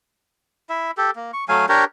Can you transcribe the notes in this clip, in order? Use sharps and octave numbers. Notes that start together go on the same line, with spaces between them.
E4 E5
G4 A4
A#3
C#6
F#3 A3 F5 G#5
D4 G4 A#4 C#5